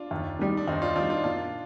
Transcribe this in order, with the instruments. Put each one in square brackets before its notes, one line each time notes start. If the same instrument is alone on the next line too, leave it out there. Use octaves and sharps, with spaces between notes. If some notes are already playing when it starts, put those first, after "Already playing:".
Already playing: [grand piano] D4 F4
[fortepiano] D#2
D#3 G3
[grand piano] D4
[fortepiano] D#2 [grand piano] C4 D#4
[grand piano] D4 F4
[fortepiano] D#3 G3 [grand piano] D4 F4
[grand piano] D4 F4
[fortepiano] A#2 [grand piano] D4 F4